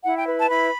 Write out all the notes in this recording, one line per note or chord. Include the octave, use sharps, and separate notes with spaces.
E4 F#5
G5
B4
A5
E4 B5